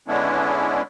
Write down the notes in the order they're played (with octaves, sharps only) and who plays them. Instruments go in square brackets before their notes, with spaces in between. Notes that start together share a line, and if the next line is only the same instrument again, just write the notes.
[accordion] D3 G#3 B3 C#4 D4 E4